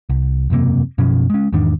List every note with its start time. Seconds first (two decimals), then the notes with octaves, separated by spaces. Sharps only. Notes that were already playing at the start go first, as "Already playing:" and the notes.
0.10 C2
0.50 E1 F#2 C3 A#3
0.98 F#2 B2 F3 C#4
1.30 G#3 C#4
1.53 E2 G#2 D#3 D4